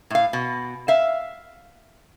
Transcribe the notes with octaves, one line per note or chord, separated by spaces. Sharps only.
A2 F5
B2
E5 F5